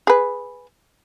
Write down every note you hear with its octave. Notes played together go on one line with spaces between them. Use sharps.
G#4 B4